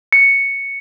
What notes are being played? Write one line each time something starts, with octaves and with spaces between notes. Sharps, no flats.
C#7